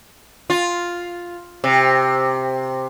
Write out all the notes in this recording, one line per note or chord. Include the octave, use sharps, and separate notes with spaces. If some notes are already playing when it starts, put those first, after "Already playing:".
F4
C3